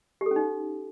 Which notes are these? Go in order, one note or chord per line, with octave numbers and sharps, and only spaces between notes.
G4
A4
C#4
D#4